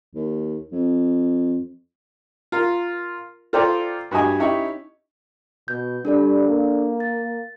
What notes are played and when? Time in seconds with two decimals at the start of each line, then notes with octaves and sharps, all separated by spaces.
0.15 D#2
0.72 F2
2.52 F4 A#4
3.53 F4 A4 C5 D5 G5 A#5
4.11 G2 F#4 G4 D#5 G#5
4.39 C#4 D#4 E4 G4 C#5
5.68 B2 G6
6.05 G3 D4 A4 D5
6.48 A#3
7.00 A6